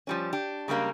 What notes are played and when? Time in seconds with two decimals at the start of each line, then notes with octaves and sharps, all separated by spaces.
0.07 F3 G3 C#4
0.33 D4 G4
0.68 C#3 G3 G#3 A#3 D4